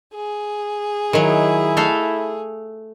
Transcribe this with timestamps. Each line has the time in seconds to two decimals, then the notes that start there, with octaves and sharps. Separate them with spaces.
0.14 G#4
1.13 D#3 F#3 E4
1.77 A3 A4 F5